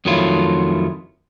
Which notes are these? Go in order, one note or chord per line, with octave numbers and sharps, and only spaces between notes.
F2 D#3 F#3 A3 E4 F4